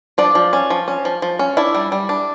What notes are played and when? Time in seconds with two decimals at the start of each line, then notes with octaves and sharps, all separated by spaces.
0.18 F3 D4 D5
0.35 F3
0.53 C#4
0.70 F3
0.88 C#4
1.05 F3
1.22 F3
1.39 C#4
1.57 D4 E4 E5
1.75 G3
1.92 G3
2.09 D4